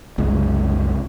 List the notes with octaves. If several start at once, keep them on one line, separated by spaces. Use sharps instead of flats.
F#1 C2 G#3